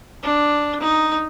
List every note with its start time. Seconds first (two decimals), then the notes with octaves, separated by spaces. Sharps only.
0.23 D4
0.81 D#4